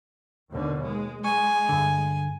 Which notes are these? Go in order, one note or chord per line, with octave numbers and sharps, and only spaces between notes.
D#2 B2 D3
G#3
G#3 G#5 C#6
G2 D3